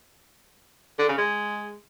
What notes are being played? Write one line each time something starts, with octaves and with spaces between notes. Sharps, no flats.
D3
C#3
G#3